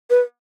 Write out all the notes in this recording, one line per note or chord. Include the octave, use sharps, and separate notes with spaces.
B4